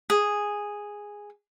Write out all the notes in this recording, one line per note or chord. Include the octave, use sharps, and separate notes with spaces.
G#4